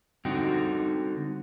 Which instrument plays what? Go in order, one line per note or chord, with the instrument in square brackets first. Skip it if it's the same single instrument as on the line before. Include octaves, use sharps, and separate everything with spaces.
[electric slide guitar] D3 G3 C4 D#4 F#4 G5